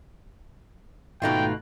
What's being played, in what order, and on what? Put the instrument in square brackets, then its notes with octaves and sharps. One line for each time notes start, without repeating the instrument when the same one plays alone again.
[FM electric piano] G#1 A3 F#6 [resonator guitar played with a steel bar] B2 D#4 F4 [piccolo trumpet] G5